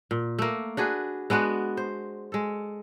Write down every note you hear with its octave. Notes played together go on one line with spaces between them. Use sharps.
A#2
A3 A#3
D4 F#4 G#4 B4
G#3 B3 D4 F#4
C5
G#3 A4